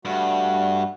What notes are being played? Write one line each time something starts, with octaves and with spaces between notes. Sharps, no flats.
G2 G3 A3 F#4